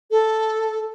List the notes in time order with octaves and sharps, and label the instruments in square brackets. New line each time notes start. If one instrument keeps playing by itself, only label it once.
[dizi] A4